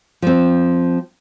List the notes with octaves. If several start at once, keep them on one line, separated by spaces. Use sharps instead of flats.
F3 C4